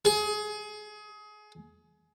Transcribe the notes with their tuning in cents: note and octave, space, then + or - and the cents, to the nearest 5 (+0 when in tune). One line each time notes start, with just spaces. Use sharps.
G#4 +25